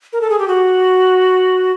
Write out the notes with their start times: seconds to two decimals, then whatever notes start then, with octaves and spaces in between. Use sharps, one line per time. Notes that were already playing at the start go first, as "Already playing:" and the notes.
0.13 A#4
0.21 A4
0.30 G#4
0.39 G4
0.48 F#4